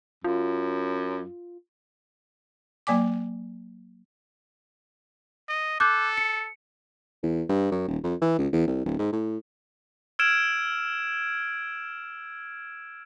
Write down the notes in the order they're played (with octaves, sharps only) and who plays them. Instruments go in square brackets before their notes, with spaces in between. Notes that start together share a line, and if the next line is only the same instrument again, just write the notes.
[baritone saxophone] F#2 [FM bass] F4
[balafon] F#3 A#3 D5 G#5 D6
[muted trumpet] D#5
[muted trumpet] A4 [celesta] D6 F#6 G6
[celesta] C#7
[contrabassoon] E2
G2
F#2
D#1
F2
E3
C#2
E2
C2
D1
G#2
A2
[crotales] E6 F6 G#6 D7 E7